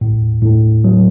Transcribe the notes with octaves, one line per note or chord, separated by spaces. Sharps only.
A2
A2
F#3